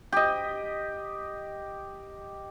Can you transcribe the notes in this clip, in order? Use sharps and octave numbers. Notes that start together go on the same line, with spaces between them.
G4 D#5